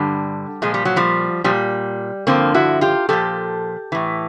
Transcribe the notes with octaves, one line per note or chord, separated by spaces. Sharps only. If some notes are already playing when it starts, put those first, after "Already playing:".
Already playing: G2 D3 G3
A#2 F3 G#3
G3
F#3
F3 G3
A#2 F3 G3
G2 D3 F3 A#3 C4
E4 F#4
F4 G4
A#2 F3 G4 A4
A2 E3